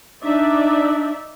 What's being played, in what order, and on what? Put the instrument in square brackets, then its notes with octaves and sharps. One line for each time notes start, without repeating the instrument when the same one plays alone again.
[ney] D4 [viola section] D#4 D5 E5